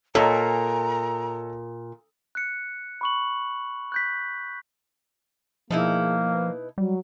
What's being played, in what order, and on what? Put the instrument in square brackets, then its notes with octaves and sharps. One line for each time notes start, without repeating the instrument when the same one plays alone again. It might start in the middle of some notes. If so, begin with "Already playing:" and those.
[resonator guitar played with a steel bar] A#2 [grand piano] A4 C#5 D#5 [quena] A#5
[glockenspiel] F#6 C#7
B5 C#6 F#7
F#6 G6 B6
[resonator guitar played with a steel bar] B2 D#4 E4 [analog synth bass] F3 [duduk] A#3 [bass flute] G#4
[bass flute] B4
[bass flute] F#3 [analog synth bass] G3